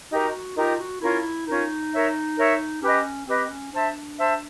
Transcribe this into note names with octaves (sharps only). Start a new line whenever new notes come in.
D#4 F#4 G4 A#4
D#4 F4 G4 A#4
F#4
C#4 E4 F4 A#4
C#4 D#4 F4 A#4
A#4 C#5 E5
A#4 C#5 E5
C#4 G4 B4 D#5
C4 G4 B4 D#5
C#4
D4 C5 E5 A5
C5 E5 A5